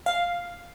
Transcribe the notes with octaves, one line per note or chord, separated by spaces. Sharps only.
F5